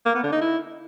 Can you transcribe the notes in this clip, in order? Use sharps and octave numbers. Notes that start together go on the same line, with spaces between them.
A#3
B3
D3
D#4
E4